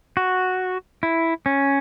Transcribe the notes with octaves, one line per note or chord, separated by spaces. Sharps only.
F#4
E4
C#4